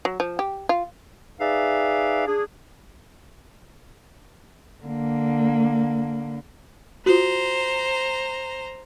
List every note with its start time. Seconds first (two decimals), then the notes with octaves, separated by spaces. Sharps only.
0.05 F#3
0.20 F3
0.39 G4
0.69 F4
1.40 D#4 G#4 B4 D5 E5 F5
2.27 D4 G#4
4.85 D3 A#3
7.06 F4 F#4 C5 A#5